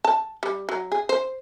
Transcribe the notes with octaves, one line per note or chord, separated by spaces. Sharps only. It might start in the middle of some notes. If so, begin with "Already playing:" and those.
A5
G3
F#3
G#4
C5